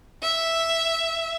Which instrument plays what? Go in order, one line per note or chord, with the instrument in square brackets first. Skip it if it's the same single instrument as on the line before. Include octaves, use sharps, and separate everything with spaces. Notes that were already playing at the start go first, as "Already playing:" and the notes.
[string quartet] E5